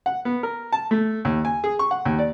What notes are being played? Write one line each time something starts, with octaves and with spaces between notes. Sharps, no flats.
F#5
B3
A#4
A5
A3
D#2
G#5
G#4
C#6
F#5
D#2
D5